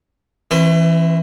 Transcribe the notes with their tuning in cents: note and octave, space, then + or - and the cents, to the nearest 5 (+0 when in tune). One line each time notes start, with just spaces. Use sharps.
E3 +0 C#4 -45 B4 +40